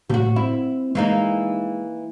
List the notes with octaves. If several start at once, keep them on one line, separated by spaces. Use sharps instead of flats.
A2 F#4 G4
C4 E4
E3 G#3 A#3 D#4